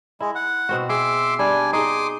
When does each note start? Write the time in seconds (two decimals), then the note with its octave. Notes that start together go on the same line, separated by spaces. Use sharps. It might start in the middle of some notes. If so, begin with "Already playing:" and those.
0.20 G#3 E4
0.35 F#5
0.69 B2 C4 F#4
0.89 G#4 E5 C6 D6
1.39 G3 D4 G#5
1.73 D#4 G#4 C6 D6 D#6